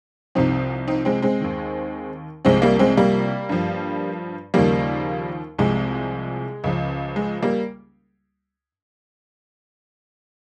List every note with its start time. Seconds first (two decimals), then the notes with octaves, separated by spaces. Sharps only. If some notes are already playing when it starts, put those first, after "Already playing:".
0.35 C2 C3 F3 C4 D#4
0.88 C4 D#4
1.05 G#3 C4
1.22 G#3 C4
1.40 D#2 D#3
2.45 C2 C3 F3 G#3 C4
2.62 G3 A#3
2.79 G#3 C4
2.97 G3 A#3
3.49 G2 F3
4.54 D#2 C#3 F3 G3 A#3
5.58 C2 C3 F3 G#3
6.64 C#2 C#3 F3
7.16 G#3
7.43 G3 A#3